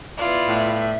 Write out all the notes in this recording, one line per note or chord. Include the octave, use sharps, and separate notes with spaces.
B3 E4 F4 D5
A2 E5